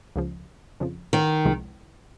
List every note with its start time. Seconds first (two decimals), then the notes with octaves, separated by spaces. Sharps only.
0.16 C#2 C#3 F3
0.80 F2 C#3 F3
1.13 D#3
1.45 C2 C3 F3 G#3